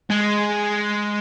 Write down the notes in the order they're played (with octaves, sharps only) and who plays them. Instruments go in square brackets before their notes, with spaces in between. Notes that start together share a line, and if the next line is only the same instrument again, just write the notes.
[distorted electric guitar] G#3